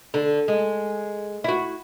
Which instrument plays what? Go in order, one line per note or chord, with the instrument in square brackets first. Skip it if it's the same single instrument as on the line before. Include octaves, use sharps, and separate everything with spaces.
[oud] D3
G#3
E4 F#4